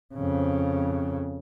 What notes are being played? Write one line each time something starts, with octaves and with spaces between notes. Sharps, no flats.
F2 C#3